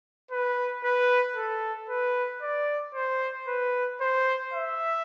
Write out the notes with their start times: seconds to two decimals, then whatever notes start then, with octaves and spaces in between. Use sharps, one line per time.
0.31 B4
0.84 B4
1.36 A4
1.89 B4
2.42 D5
2.95 C5
3.48 B4
4.01 C5
4.53 E5